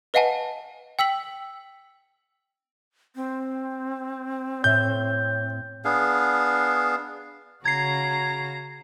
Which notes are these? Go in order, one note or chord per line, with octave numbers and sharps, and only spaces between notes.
B4 D#5 F5 F#5 G#5 A5
G5 E6 B6 F#7
C4
A2 C#5 E5 G6
B3 D4 G#4 F5
C#3 F#4 A#5 G#6 C7